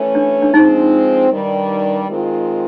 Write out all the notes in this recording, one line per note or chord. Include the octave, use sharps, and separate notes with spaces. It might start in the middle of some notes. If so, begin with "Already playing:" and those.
Already playing: E3 A3 C#4
D4
D4
F3 G#3 C4 D#4
G2 D#3 G3
D#3 G#3 C4 F4